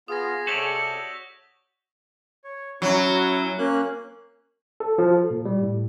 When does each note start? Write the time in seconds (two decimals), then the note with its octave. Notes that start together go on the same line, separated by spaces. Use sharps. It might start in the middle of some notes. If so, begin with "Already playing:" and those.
0.08 B3 F4 G#4 D#6 A#6
0.47 C3 F#4 A4 C#5 D5 G6 B6 G7
0.75 E6 G6
2.44 C#5
2.82 F#3 C#4 E4 F#4
3.58 A#3 C#4 F#6
4.80 A4
4.98 F3
5.16 A4
5.30 A#2
5.45 G3
5.62 A2